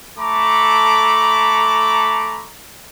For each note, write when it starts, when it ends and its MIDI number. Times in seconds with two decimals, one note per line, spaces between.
0.18 2.47 57
0.18 2.47 69
0.18 2.47 82
0.18 2.47 83
0.18 2.47 86